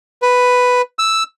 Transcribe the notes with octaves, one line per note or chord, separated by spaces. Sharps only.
B4
E6